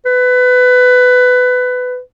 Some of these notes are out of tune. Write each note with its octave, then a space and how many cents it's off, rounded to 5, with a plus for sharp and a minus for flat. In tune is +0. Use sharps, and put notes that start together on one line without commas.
B4 +20